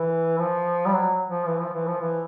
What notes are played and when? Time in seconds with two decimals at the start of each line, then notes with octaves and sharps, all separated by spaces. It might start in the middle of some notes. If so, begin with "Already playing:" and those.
Already playing: E3
0.39 F3
0.86 G3
0.93 F#3
1.29 F3
1.47 E3
1.60 F3
1.74 E3
1.87 F3
2.01 E3